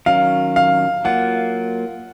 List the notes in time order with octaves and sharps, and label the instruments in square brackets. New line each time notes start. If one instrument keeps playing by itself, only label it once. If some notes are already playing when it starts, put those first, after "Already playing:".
[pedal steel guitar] D#3 F#3 C#4 [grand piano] F5
[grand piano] F5
[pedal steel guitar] F#3 A#3 F4 [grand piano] F#5